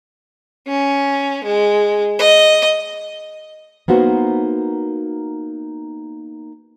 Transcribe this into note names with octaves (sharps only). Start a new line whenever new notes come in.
C#4
G#3
D#5
A#3 B3 D#4 F#4 C5